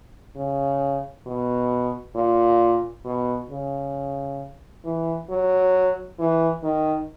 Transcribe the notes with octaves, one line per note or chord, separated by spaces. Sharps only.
C#3
B2
A#2
B2
C#3
E3
F#3
E3
D#3